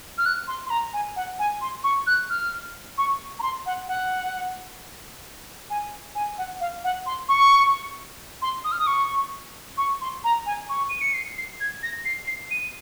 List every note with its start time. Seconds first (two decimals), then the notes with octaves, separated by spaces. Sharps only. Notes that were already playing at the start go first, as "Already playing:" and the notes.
0.17 F6
0.25 F#6
0.47 C6
0.66 C6
0.70 A#5
0.93 G#5
1.15 F#5
1.39 G#5
1.61 C6
1.83 C#6
2.06 F#6
2.29 F6
2.97 C#6
3.39 A#5
3.42 C6
3.65 F#5
3.87 F#5
5.69 G#5
6.15 G#5
6.37 F#5
6.60 F5
6.83 F#5
7.06 C6
7.28 C#6
8.41 C6
8.64 D#6
8.71 F6
8.79 D#6
8.86 C#6
9.77 C#6
10.01 C6
10.23 A#5
10.45 G#5
10.69 C#6
10.88 D#7
11.00 C#7
11.13 C7
11.37 C7
11.60 G#6
11.82 A#6
12.04 C7
12.26 C7
12.50 D#7